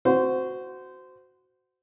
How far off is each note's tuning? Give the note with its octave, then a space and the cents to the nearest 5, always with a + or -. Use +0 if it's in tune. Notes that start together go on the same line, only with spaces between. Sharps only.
F#4 +0 C5 -20